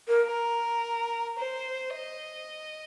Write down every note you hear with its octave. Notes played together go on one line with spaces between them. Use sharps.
A#4
A#4
C5
D#5